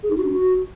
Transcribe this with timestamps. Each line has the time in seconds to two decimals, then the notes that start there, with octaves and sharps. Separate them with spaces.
0.03 G#4
0.10 D#4
0.18 F#4
0.25 D4
0.32 F#4